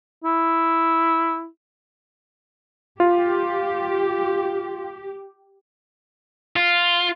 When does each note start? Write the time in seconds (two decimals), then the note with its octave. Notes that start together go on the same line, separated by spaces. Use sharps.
0.24 E4
3.00 F4 G4
6.56 F4